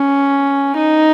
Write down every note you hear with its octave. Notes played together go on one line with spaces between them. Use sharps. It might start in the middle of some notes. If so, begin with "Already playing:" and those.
Already playing: C#4
D#4